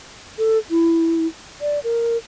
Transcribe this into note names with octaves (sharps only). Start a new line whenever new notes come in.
A4
E4
D5
A#4